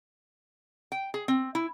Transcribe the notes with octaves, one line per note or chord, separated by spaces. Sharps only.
G5
G#4
C4
E4